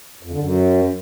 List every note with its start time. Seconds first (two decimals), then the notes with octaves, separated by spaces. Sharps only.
0.23 F2
0.32 D3
0.41 F#2